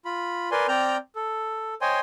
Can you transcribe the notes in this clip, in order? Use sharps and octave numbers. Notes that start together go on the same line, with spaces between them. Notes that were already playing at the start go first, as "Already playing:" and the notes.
F4 B5
A#4 B4 D5 G#5 C6
C4 D5 G5 A#5 F6 G6
A4
C5 C#5 D#5 G5 G#5 C6